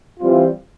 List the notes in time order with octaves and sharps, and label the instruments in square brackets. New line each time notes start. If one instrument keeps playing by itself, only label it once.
[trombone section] E3 G3 C4 F4